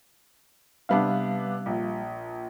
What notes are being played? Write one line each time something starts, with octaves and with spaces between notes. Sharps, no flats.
C3 G3 B3 D4 F5
A#1